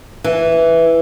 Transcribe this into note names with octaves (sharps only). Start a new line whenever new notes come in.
E3